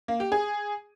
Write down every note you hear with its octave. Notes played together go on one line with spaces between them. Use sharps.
A#3
G4
G#4